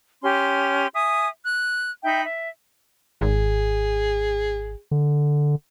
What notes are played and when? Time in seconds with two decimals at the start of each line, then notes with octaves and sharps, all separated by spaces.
0.22 C#4 G4 C6
0.94 E5 G#5 D#6
1.45 F#6
2.03 D#4 E5 G5 B5
2.24 E5
3.21 G#1 G#4
4.91 D3